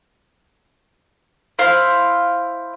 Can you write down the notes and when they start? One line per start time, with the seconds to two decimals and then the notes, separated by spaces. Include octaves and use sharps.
1.59 E4 C5 F5